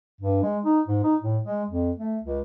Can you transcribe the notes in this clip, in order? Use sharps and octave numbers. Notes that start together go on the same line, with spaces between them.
G2
G#3
D#4
G#2
D#4
A2
G#3
F2
A3
C#2